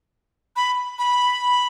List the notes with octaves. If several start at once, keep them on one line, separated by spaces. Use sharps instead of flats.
B5
B5